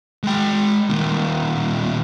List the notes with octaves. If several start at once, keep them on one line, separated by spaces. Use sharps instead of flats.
G#3 G5
D#2 A#2